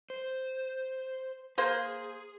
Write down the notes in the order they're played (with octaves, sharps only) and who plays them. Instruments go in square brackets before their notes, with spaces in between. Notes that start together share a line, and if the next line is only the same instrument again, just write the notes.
[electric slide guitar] C5
[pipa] A#3 C5 [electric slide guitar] G#4